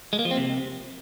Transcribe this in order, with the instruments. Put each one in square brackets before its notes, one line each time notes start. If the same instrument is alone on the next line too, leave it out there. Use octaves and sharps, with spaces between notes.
[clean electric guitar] G#3
A#3
F3
C4
C3